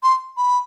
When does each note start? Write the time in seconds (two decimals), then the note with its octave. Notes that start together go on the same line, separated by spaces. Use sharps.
0.03 C6
0.37 B5